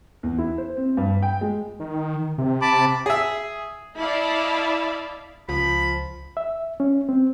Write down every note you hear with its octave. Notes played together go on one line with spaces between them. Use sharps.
E2
E4
C5
C4
G2
G5
G#3
D#3
C3
A5 B5 D6
G#4 E5
E4 D5 D#5 F5 A5 B5
C#2 F3 B5
E5
C#4
C4